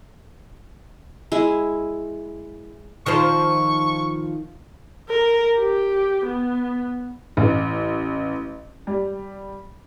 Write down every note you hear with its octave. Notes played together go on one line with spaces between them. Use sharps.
G#3 E4
D#3 F3 C5 C#6
A#4
G4
B3
A1
G3